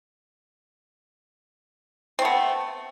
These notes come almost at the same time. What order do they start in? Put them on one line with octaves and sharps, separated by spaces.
C4 A3 B3